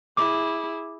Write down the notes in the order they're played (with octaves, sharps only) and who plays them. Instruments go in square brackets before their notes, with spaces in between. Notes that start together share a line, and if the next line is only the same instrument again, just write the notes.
[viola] E4 G#4 [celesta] D6